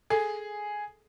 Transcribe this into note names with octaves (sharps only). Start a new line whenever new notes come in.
G#4 A4